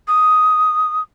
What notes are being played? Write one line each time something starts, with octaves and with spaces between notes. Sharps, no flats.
D#6